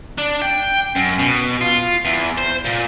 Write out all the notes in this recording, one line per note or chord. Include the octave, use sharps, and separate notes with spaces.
D4
G5
F#2
B2
F4
E2
C5
A#2